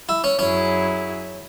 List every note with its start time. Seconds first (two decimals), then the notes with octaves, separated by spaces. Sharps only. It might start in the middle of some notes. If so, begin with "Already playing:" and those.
0.09 E4
0.24 C#4
0.39 F#2 F#3 C#4 E4 G#4